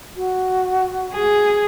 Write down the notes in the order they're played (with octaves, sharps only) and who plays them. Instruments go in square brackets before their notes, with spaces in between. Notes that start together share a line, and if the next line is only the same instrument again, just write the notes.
[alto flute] F#4
[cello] G#4